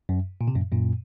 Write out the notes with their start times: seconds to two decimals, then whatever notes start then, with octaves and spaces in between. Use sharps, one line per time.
0.09 F#2
0.41 A#2
0.48 C3
0.55 F#2 A#2
0.72 F#2 A#2